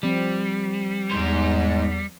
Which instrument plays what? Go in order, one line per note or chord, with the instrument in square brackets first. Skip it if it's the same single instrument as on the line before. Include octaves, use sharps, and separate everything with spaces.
[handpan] F3 C4 [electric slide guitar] G3
[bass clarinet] E2 [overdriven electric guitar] G#2 C5